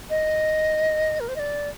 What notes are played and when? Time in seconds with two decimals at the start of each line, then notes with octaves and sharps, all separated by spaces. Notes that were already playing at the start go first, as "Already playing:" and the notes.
0.10 D#5
1.20 A#4
1.28 C5
1.36 D#5
1.39 D5